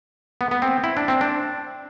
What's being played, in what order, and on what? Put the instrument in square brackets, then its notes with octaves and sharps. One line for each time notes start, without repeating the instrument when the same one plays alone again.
[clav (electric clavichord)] B3
B3
C4
E4
D4
C4
D4